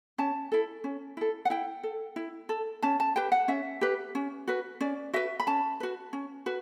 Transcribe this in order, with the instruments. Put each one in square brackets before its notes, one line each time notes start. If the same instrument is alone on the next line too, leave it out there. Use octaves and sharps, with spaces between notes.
[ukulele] C#4 A5
E4 A4
C#4
E4 A4
F#5
E4 G5
A4
E4
A4
C#4 A5
A5
G4 B4 G5
F#5
C#4 E5
G4 B4
C#4
F#4 B4
C#4 D5
F#4 B4 E5
B5
C#4 A5
F#4 B4
C#4
F#4 B4